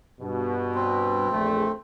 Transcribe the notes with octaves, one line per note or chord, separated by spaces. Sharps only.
G2 B2
C4
A#1 E2 A3